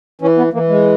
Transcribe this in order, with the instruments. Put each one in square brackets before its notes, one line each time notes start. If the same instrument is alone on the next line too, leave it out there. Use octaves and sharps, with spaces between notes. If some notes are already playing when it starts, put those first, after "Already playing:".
[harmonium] E3 C#4
B3
E3 A#3
G#3